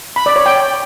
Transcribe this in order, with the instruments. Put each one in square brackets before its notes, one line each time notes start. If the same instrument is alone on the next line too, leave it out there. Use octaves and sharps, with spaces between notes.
[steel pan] B5
D5
C#5
G5